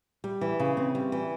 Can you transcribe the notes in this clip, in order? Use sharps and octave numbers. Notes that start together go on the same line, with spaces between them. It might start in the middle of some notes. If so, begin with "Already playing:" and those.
G3
E3
C#3
C4
G3
E3